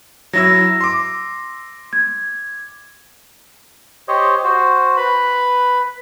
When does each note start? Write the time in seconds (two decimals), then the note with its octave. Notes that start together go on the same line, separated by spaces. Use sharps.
0.33 F#3 E4 E6 A#6
0.81 C6 D6
1.93 G#6
4.08 G4 C5 C#5 D#5
4.44 F#4 C5
4.97 B4 B5